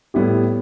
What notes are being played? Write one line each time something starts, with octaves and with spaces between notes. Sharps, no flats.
A2 G3 B3 E4 G4